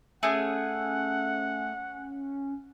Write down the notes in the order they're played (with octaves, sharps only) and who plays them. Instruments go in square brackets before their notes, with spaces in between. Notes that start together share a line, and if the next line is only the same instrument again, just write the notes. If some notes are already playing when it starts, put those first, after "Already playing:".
[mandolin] A3 G#4 G#5 [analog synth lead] C#4 [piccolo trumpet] F#5